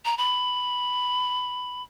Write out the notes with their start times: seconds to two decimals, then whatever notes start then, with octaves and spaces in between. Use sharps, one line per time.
0.05 A#5
0.17 B5